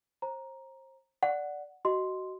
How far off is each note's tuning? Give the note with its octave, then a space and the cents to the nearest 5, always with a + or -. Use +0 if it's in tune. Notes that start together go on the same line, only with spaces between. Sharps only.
C5 +30 A#5 +10
D5 +0 F#5 +0
F#4 +25 D#5 +0 C6 +0